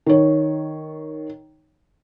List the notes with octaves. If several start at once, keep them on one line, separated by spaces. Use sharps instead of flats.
D#3 C#5